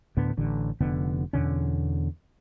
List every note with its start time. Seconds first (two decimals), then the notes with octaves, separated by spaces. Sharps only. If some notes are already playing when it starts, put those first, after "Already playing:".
0.17 D2 A2 D3 B3
0.38 A1 D3
0.80 F1 D3 B3
1.33 E2 B2 D3 C#4